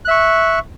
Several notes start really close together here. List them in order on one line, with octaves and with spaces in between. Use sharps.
F#6 E5 C#6